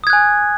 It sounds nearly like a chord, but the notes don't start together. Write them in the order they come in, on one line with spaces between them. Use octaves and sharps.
D#6 G#6 F#6 G#5